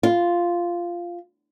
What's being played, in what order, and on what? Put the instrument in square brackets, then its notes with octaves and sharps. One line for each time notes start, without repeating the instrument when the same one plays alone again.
[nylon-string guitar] F4